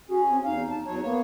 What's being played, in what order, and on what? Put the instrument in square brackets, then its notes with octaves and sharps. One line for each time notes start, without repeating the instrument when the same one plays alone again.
[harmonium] C#4 G#4 [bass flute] F#4
[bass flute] C4
[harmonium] E2 F5 [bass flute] D#4
[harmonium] A5
E2 F#3 C#5
[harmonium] A#3 C#5 [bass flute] B3